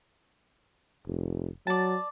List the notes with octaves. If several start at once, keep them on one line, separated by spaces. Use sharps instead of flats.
F1
F#3 D5 A5